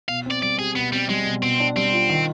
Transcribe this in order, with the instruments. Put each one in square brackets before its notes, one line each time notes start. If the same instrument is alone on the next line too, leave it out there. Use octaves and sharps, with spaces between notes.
[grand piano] B2 [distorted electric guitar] F5
[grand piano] C4 [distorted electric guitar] D5
[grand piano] G3 [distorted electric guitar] D5
[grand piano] G4 [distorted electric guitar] G#4
[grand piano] B2 [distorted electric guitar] B3
[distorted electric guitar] G3 [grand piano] C4
[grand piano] G3 [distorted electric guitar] G#3
[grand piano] B2
[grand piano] B2 [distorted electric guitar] C4
[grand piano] D4
[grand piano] G3 [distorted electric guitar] C4
[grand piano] F4
D#3